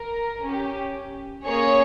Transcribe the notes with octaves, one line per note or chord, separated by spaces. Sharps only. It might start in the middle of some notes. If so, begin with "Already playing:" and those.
Already playing: A#4
C#4 G4
A#3 C#4 G#4 C#5